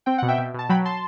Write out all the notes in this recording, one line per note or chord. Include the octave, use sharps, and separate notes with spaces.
C4 G5
B2 F#5
E5 G5
B2
B2 A5
F#3 G5 B5
A5 C6